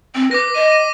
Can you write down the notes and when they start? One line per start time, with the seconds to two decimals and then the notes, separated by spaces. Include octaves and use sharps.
0.15 C4
0.31 B4 D6 A#6
0.54 D#5 D#7
0.68 D6 A#6 D#7